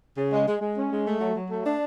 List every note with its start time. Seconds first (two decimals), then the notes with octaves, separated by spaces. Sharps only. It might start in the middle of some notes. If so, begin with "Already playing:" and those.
0.17 C#3
0.33 G#3
0.48 G#3
0.61 G#3
0.77 C#4
0.91 G#3
1.06 A3
1.21 F#3
1.36 F#3
1.51 A3
1.65 D4